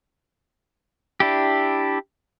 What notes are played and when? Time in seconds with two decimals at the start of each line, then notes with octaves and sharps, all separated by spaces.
1.20 D4 E4 G4